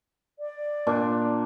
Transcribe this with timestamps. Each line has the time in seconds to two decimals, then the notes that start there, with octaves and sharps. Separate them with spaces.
0.39 D5
0.87 A#2 D4